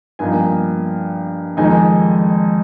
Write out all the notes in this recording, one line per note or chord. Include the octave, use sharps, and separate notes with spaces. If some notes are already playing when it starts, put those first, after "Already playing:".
G2 F3 A#3 D#4 G#5
F2 D#3 G#3 D#4 G#5